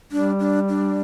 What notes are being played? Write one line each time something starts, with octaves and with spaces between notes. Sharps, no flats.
G3 D4
D4
D4